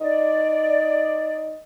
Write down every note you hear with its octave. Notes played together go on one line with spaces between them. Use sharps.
D#4 D5